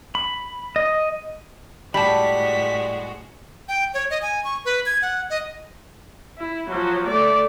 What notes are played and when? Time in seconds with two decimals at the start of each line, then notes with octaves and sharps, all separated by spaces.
0.15 B5
0.76 D#5
1.94 A2 G3 G#3 F#4 A5 B5 B6
3.68 G5
3.94 C#5
4.10 D#5
4.22 G#5
4.44 C#6
4.65 B4
4.86 G#6
5.02 F#5
5.30 D#5
6.38 E4
6.70 F3 F#3
7.07 A3 D5